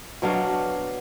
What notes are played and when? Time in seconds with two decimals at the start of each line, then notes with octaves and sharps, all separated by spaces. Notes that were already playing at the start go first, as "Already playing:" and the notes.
0.22 B2 F#3 D4 F5